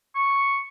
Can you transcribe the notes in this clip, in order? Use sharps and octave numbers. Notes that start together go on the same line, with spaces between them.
C#6